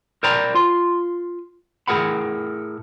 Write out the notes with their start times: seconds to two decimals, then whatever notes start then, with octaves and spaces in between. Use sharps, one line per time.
0.23 A#4 C5 D5 G5 A#5 B5
0.55 F4 C6
1.88 A2 G#4 A#4 F#5 B5